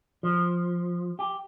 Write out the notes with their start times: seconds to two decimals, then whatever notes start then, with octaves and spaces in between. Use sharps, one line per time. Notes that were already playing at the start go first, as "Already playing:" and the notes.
0.23 F3
1.19 G4